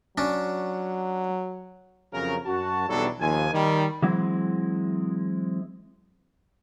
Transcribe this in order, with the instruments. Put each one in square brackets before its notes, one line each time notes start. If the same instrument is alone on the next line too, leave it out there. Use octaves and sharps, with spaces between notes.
[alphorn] F#3 [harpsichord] C#4 D4
[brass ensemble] F2 C#3 F#3 C#4 A#4
F#2 F#4 A5
B1 E2 F#3 G3 D4 A4
D#2 F3 G#5
D#3 G3
[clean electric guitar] E3 F#3 G#3 C4 E4